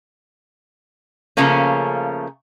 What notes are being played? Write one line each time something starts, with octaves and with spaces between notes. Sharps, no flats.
C#3 F3 A3 A#3 C#4